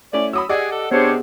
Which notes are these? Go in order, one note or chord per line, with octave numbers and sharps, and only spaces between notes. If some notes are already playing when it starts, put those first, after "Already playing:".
A3 C#4 E4 D5
F#3 B5 D#6 E6
G4 G#4 D5 D#5 F#5
A4
C3 B3 D4 G4 G#4 C5 C#5